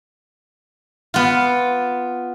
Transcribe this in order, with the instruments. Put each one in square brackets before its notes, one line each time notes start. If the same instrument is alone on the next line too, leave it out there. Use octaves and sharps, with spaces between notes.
[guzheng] B3 F4